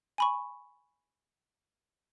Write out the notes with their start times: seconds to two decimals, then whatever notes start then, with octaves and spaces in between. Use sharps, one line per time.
0.18 G#5 B5 C#6